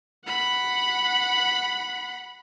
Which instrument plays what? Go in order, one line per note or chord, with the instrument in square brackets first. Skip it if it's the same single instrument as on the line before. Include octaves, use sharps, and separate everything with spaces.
[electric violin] F#5 B5